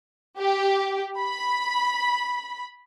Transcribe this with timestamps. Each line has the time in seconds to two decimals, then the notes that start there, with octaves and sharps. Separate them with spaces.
0.38 G4
1.19 B5